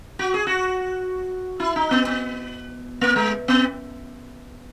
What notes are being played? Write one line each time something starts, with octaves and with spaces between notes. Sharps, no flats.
F#4
G#4
F#4
E4
D#4
B3
B3
A#3
G#3
B3